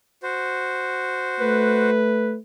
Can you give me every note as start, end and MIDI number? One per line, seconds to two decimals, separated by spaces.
0.23 1.90 66
0.23 1.90 72
1.40 2.38 57
1.40 2.35 71